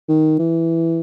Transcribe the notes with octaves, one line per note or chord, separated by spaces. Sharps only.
D#3
E3